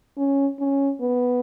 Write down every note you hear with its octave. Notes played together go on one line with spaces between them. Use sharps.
C#4
C#4
B3